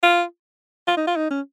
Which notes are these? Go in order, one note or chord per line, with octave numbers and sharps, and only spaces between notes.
F4
F4
D#4
F4
D#4
C#4